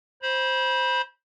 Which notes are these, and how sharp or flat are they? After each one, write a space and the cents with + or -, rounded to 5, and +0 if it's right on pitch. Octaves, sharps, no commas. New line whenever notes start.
C5 +5 B5 -25